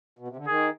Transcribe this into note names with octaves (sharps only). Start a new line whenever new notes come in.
B2
C3
D3
D#3 G#4